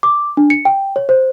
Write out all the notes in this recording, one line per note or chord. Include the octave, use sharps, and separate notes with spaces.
D6
D4
C#7
G5
C#5
C5